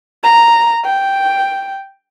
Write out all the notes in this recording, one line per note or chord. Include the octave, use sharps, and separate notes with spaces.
A#5
G5